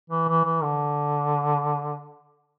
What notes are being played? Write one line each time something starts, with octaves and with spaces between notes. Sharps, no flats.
E3
E3
E3
D3